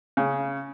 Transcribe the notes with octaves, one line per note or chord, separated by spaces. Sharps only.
C#3